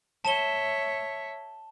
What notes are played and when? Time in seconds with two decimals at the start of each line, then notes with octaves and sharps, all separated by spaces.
0.25 C#5 E5 A5 E7 G7